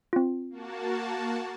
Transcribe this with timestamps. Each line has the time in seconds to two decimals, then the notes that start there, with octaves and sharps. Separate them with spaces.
0.13 C4 F4
0.50 A#3 F#4 A5